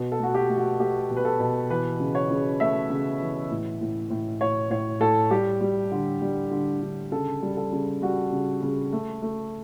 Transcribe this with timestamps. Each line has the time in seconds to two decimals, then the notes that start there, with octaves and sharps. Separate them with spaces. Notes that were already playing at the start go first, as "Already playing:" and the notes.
Already playing: B2
0.12 A4
0.19 A3 F#4
0.35 G4
0.49 A3
0.57 F#4
0.80 A3 G4
1.10 B2
1.17 B4
1.25 A4
1.40 B2
1.70 E3 B4
2.00 C#3
2.15 C#5
2.31 C#3
2.60 A3 E5
2.90 C#3
3.21 E3
3.51 A2
3.81 A2
4.10 A2
4.41 A2 C#5
4.70 A2 C#5
5.00 A2 A4
5.30 G3 G4
5.61 G3
5.92 D3
6.22 G3
6.51 D3
6.82 D3
7.11 C#3 A4
7.42 G3
7.57 A4
7.72 C#3
8.02 G3 F#4
8.32 C#3
8.62 C#3
8.93 A3
9.22 A3